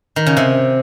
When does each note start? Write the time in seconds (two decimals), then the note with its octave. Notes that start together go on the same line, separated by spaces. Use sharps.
0.16 D#3
0.26 C#3
0.37 C3